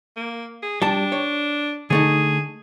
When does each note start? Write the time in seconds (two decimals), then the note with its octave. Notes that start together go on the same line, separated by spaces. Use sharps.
0.17 A#3
0.63 G#4
0.82 G3 D4 A5
1.12 C#5
1.90 D3 A3 D#4 G#4